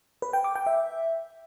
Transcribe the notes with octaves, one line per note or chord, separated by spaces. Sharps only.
B4
G5
D6
G5
E5